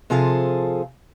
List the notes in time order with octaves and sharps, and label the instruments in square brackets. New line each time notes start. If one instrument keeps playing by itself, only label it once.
[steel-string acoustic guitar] C3 F3 F4 G#4 A4 F5